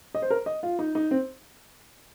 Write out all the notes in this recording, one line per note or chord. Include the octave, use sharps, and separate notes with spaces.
D#5
C5
A#4
D#5
F4
D#4
D#4
C4